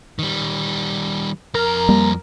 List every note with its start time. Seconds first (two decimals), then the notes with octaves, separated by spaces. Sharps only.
0.19 D#3 G3
1.55 F2 A#4 A#5
1.89 G3 A#3